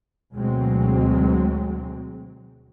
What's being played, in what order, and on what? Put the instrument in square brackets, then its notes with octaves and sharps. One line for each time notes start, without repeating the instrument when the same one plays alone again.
[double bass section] D2 B2 F#3 G#3 C4